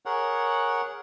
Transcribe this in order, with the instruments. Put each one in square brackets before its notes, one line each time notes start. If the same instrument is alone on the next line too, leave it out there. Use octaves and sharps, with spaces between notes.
[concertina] G#4 A#4 C#5 F#5